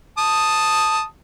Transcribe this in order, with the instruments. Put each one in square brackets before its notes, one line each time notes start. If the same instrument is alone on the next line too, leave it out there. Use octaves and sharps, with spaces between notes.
[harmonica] A5 D#6